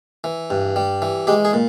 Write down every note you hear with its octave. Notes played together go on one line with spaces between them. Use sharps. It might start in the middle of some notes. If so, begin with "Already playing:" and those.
E3
G2
G3
E3
G#3 G4
G#4
A#2